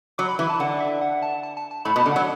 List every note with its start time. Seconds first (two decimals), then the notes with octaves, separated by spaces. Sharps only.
0.18 F#3 D6
0.28 B5
0.39 E3 B5
0.49 A5
0.60 D3 F#5
0.80 E5
1.02 F#5
1.22 A5
1.43 A5
1.57 A5
1.71 A5
1.85 A2 B5
1.96 B2
1.98 A5
2.06 D3
2.12 F#3 F#5